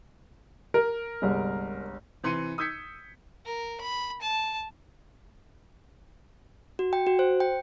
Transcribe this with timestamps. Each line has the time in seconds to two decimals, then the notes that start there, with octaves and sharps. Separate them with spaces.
0.74 A#4
1.22 G1 C2 G#3
2.23 C3 E3 C6 C#7 D#7
2.58 D#6 E6 G6 G#6 B6 C#7
3.46 A#4
3.81 B5
4.22 A5
6.79 F#4
6.93 G5
7.07 F#4
7.19 C5
7.40 G5